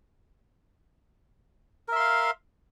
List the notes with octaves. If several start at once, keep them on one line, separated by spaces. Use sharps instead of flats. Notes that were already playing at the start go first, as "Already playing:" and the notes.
A#4 E5 F5 C6